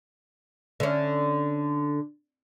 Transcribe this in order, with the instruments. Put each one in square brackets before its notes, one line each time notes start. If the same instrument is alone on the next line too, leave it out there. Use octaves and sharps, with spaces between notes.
[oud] D3 C#4